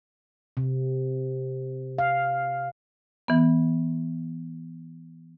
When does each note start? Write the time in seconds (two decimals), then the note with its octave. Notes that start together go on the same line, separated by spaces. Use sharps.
0.57 C3
1.98 F5
3.28 E3 B3